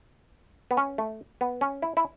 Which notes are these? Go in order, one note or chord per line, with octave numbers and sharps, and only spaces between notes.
B3
C#4
A3
B3
C#4
E4
E4